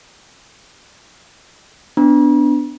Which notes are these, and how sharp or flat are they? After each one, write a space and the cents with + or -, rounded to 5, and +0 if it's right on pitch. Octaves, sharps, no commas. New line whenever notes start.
B3 +30 D4 +0 A#5 +45